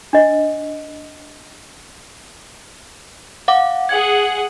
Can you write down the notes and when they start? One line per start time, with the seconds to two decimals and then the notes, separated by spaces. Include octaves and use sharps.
0.13 D4 D#5
3.48 F5 F#5 D6
3.89 G#4 F#5 G#6